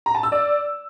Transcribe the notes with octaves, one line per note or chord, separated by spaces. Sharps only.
A#5
A5
E6
D5